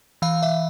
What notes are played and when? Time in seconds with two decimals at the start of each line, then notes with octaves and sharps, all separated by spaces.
0.22 E3 F5
0.43 E5